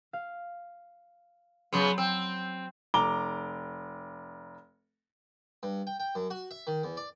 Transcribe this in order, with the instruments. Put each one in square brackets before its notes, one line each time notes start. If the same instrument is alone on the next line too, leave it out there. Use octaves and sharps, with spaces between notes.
[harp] F5
[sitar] C#3 B3 [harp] F#3 C6
[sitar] C4 [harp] E6
[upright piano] F1 A#5 D6 G7
[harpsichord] G2
G5
G5
F#2
F#4
E5
D#3
E2
D5